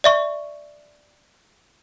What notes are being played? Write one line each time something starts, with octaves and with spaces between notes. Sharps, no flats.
D5 E5 C#6